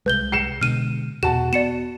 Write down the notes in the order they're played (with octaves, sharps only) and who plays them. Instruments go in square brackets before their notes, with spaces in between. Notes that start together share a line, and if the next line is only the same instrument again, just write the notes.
[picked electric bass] C2 G#3 [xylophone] B4 G6 G7
[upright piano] C7 C#7 E7
[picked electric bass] B2 D3 G#3 [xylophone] F6 D#7
[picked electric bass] E1 B2 [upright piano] F#4 A5 [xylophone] E7
[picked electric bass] B3 [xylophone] D5 C#7 E7